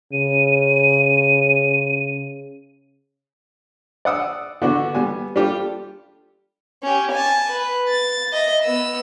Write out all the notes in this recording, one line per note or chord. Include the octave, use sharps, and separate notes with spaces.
C#3 D#7
D5 F#5 D#6 E6
D3 B3 D4 F#4
G3 B3 G#5
G3 D4 F4 G4 A4
C#4 G4
G#5 A5
B4
A6
D#5 E5
B3 E6